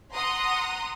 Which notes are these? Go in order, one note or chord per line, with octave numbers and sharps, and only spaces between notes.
F#5 A#5 C6 D#6